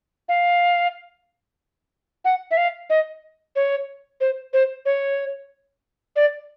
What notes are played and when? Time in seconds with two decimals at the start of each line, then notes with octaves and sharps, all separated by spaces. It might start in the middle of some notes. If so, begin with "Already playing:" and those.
0.29 F5
2.25 F#5
2.51 E5
2.57 F5
2.90 D#5
3.56 C#5
4.21 C5
4.53 C5
4.86 C#5
6.16 D5